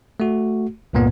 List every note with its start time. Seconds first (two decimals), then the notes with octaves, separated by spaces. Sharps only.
0.20 A3 F#4
0.93 C#2 G2 A#2 A#3 B3